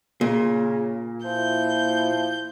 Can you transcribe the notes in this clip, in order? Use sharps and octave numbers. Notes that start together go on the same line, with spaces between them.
A#2 C#3
F3 E4 G6